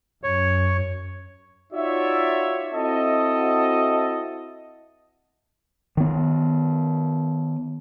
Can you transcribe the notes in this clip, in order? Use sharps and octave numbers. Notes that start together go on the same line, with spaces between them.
F#2 C#5
D#4 F4 F#4 C#5 D5 E5
C4 E4 F#4 A4 D#5
D#3 B3